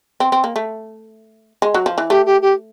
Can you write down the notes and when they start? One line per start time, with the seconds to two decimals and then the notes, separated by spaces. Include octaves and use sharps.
0.20 C4
0.32 C4
0.44 A#3
0.56 A3
1.62 G#3
1.74 F#3
1.86 F3
1.98 E3
2.10 A3 G4
2.26 G4
2.41 G4